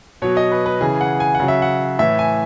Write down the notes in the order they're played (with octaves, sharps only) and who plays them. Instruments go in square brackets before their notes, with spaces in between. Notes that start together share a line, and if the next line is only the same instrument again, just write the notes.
[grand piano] B2 F#3 C#5
D#5
B4
B4
C#3 E3 G#4
F#5
G#5
F#5
C#3 F#3
E5
F#5
A2 E3 E5
G#5